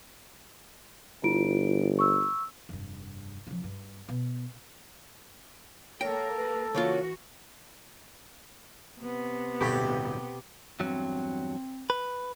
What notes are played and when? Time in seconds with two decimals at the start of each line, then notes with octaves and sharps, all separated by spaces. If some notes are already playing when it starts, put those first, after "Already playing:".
1.23 G1 E4 F4 D7
1.99 C#6 E6
2.69 F1 G2
3.47 C#3 F3
3.64 G2
4.09 B2
6.01 A#3 A4 A#4 C#5 G5
6.36 B4
6.75 C#3 E3 A#3 F4 F#4 C#5
9.01 C3 B3
9.61 D1 G2 B2 G4 C#6
10.80 E2 G2 F#3 C4
11.90 B4